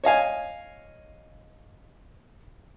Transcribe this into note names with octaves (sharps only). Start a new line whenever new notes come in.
C#5 D#5 F5 G#5